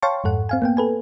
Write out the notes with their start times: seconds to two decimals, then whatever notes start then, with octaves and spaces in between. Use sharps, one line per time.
0.02 C#5 F5 G5 A5 C6 C#6
0.24 F2 G#2 A4 F#5
0.49 C4 F5 G#5
0.62 A#3 B3 G5
0.77 A4 B4 G#5